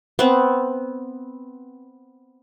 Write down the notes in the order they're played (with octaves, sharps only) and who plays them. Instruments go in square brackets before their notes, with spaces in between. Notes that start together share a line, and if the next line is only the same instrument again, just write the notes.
[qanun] B3 C4